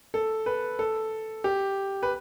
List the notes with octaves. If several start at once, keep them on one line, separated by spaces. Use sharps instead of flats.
A4
B4
A4
G4
B4